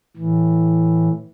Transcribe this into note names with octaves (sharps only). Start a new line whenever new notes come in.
A2 E3